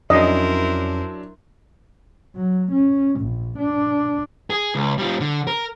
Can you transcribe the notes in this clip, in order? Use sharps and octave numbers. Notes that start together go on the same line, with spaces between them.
F2 F#3 C#4 D4 E4 A#4 C5 D#5
F#3
C#4
A#1
D4
G#4
C#2
G3 F4
D3
A#4